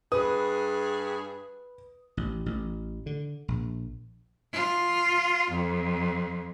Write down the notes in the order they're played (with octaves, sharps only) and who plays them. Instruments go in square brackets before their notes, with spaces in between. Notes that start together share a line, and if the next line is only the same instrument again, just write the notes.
[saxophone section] G2 G#4 [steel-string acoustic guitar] B4 [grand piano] D#6
[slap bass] A1
A1
D3
A#1
[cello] F4
F2